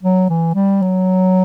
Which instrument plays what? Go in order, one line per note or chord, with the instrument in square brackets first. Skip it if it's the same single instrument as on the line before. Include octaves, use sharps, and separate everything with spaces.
[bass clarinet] F#3
E3
G3
F#3